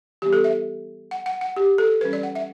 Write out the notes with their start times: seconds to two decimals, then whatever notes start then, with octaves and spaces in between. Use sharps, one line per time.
0.22 E3 G3 B3 G4
0.33 A4
0.44 E5
1.11 F#5
1.26 F#5
1.41 F#5
1.56 G4
1.78 A4
2.01 E3 G3 C#4 B4
2.13 D5
2.23 F#5
2.35 E5